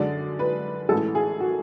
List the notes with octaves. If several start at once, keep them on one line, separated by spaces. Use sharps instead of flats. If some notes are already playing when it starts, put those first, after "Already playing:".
Already playing: F#2 D3 G#3 D5
B4
A1 A2 E3 G#3 A4
G#4
F#4